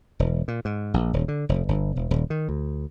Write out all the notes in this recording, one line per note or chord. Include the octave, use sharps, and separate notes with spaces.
E1
A#2
G#2
A#1
D#1
D3
F1
G1
E1
D#1
D#3
D2